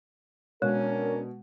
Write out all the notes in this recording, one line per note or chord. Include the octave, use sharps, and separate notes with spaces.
B2 G#3 C#4 D4 A#4 C#5